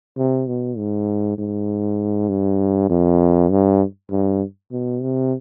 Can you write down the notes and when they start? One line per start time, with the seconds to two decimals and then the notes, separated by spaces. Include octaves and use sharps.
0.18 C3
0.48 B2
0.78 G#2
1.38 G#2
2.29 G2
2.90 F2
3.51 G2
4.11 G2
4.72 B2
5.02 C3